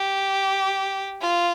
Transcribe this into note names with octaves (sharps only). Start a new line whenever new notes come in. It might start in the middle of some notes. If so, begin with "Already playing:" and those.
Already playing: G4
F4